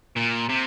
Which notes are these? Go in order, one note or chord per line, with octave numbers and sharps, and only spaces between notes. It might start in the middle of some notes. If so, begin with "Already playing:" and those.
A#2
C3